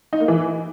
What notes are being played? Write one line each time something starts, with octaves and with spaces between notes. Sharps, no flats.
D#4
A#3
E3